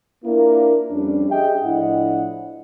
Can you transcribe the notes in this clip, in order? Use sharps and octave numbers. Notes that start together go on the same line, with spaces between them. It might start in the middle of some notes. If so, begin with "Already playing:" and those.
A#3 D4 E4 F4 A#4
F2 G3 C#4 D4
G4 G#4 D#5 E5 G5
A2 F3 D4 E4 D#5 F#5